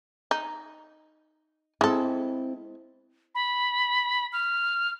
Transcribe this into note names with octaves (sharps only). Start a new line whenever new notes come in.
D#4
G#3 C4 E4 A4
B5
F6